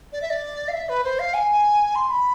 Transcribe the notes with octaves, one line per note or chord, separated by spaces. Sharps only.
D5
E5
D5
F5
E5
B4
C5
F5
G#5
C6
B5